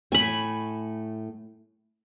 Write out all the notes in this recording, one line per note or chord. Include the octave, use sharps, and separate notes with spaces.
A2 A3 G#5 B5